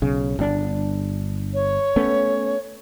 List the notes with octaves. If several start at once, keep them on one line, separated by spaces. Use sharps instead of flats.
B1 C#3
G1 D4
C#5
A3 B3 C#4